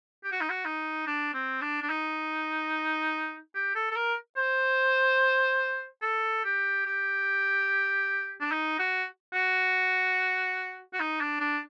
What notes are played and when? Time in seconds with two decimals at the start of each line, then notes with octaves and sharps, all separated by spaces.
0.24 G4
0.32 F#4
0.41 D#4
0.50 F#4
0.65 D#4
1.07 D4
1.34 C4
1.62 D4
1.82 D4
1.90 D#4
3.55 G4
3.75 A4
3.91 A4
3.96 A#4
4.37 C5
6.02 A4
6.44 G4
6.86 G4
8.41 D4
8.51 D#4
8.79 F#4
9.34 F#4
10.93 F#4
11.00 D#4
11.21 D4
11.40 D4